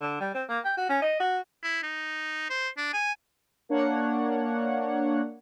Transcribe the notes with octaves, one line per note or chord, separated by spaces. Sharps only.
D3
G3
C4
A#3
G5
F#4
C#4
D#5
F#4
E4
D#4
C5
D4
G#5
A#3 D4 C#5 F#5